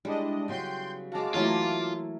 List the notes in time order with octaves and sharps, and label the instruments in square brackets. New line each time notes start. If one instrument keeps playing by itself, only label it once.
[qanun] G3 [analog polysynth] G#3 D4 D#5 [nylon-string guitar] E4
[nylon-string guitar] C#3 F#3 B3 [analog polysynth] G5 C6 G6
[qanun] G#3 F#4 [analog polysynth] F5 A5 D6
[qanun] E3 F#3 A#3 [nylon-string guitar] A3 E4 E5 [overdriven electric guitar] F4